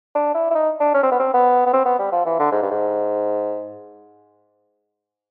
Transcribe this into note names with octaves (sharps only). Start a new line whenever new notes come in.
D4
E4
E4
D#4
D4
C#4
C4
B3
C4
B3
B3
C4
B3
G3
F3
E3
D3
G#2
G2
G#2